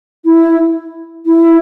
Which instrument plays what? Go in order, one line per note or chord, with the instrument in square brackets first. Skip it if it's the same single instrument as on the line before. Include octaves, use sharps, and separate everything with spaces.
[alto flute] E4
E4